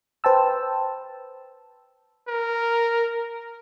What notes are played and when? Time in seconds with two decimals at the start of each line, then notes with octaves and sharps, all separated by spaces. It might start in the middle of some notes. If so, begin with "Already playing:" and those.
0.24 B4 C5 G5 A5 E6
2.28 A#4